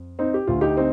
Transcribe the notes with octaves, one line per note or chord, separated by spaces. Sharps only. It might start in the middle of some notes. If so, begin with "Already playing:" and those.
Already playing: F2
C4 D#4
G4
D2 D3 F4
D#4 G4
C4 D#4